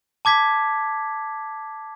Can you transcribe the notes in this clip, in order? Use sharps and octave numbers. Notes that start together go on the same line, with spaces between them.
A5 D6 G#6 B6